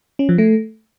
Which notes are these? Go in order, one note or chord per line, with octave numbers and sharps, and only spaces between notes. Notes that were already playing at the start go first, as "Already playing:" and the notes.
C#4
F3
A3